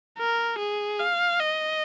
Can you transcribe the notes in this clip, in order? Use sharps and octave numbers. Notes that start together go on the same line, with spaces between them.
A#4
G#4
F5
D#5